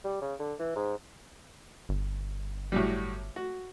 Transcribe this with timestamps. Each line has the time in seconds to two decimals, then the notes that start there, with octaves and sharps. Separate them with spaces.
0.04 G3
0.21 C#3
0.39 D3
0.59 E3
0.75 G#2
1.89 G1
2.72 A2 F#3 G3
3.36 F#4